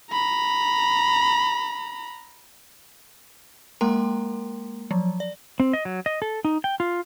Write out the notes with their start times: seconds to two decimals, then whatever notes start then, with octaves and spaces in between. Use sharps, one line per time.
0.11 A#5 B5
3.81 G#3 A#3 A#4 G5 A#5 C6
4.91 F3 F#3
5.20 D5
5.60 C4
5.73 D#5
5.85 F#3
6.06 D#5
6.22 A4
6.45 D#4
6.64 G5
6.80 F4